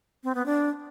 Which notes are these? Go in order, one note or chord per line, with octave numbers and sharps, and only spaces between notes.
C4
B3
D4